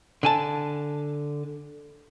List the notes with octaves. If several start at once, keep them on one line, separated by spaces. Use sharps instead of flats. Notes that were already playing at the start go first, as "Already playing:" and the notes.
D3 G#5 A5